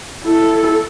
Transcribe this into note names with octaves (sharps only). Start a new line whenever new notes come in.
E4 A4